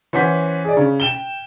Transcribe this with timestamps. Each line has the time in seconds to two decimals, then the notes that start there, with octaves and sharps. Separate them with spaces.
0.13 E3 C#4 C5 F#5 B6
0.65 G#4 D5
0.77 C#3
1.00 G5 E7 G7